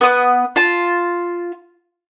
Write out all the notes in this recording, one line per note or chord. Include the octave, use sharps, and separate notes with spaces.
B3 D#6
F4 A5